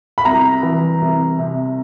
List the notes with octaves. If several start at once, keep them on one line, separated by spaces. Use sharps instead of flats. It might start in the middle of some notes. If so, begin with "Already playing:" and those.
B5
C2 A#5
E3
C2
C3